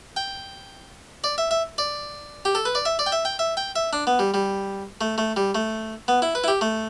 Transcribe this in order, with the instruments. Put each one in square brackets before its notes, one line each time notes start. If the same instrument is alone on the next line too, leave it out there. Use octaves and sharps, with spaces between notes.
[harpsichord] G5
D5
E5
E5
D5
G4
A4
B4
D5
E5
D5
G5
E5
G5
E5
G5
E5
D4
B3
G3
G3
A3
A3
G3
A3
B3
E4
B4
E4
G4
A3